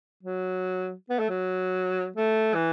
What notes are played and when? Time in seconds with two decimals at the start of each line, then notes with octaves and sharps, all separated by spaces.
0.23 F#3
1.10 B3
1.19 A3
1.29 F#3
2.16 A3
2.55 E3